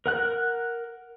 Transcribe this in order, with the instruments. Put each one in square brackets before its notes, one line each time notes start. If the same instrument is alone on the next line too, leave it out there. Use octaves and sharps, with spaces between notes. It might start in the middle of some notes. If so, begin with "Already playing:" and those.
[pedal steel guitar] A#4 F#5 F#6